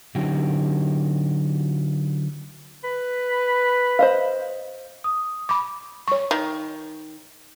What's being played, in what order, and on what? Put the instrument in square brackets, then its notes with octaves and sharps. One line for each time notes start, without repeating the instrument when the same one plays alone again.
[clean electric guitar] D3 F#3 D#4 F#4 G4
[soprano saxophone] B4
[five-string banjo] C5 D#5 F5
[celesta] D#6
[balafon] B5 D6
C#5 C#6
[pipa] D#3